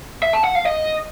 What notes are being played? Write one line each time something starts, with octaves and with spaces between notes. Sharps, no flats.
E5
A5
F#5
F5
D#5